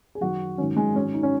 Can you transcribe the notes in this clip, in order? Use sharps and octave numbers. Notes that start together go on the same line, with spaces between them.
G#4
F#2 D#3 F#3 F#4
G#2 D#3 F#3 C#4
G#3
G#2 D#3 F#3 C#4
D#4
C#4